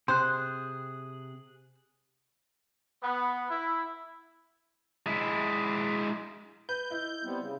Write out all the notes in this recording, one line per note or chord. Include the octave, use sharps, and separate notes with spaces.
C3 G#4 C5 F#6
B3
E4
G#3 E4
B4 G6
E4 D#5
G3 B3 C4
C#3